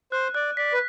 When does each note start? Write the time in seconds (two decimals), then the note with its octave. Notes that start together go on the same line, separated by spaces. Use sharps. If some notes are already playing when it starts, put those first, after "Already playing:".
0.12 C5 F#6
0.35 D5 F#6
0.57 D5 B6
0.73 B4